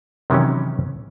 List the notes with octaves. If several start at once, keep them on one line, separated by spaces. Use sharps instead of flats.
C3 D#3 E3 F#3 C#4